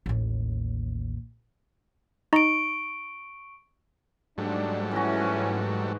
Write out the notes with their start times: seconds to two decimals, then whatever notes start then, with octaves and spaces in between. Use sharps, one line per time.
0.06 A1 D#2
2.33 D#4 D#5 A#5 C#6 D7
4.38 G#2 F#3 G3 A3 D4
4.91 E3 C#4 E4 F#4